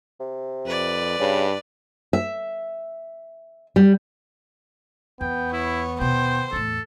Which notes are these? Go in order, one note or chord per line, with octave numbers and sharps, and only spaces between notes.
C3
F2 B4 D5
G2 C#3
E5
G3
E2 B3 G5
E4 C#5
D#2 B2 C5 G5
E2 A2 A4